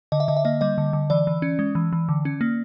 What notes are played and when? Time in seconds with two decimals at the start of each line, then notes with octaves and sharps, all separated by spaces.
0.12 D3 D#5
0.20 E5
0.28 D3 D#5
0.37 E5
0.45 A#3 D#5
0.61 G3 D#5
0.78 D3
0.93 D3
1.10 E3 D5
1.27 E3
1.42 C#4
1.59 G#3
1.75 E3
1.93 E3
2.09 D3
2.25 C#4
2.41 A#3